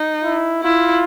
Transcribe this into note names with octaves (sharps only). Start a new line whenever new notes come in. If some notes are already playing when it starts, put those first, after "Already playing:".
Already playing: D#4
E4
E4 F4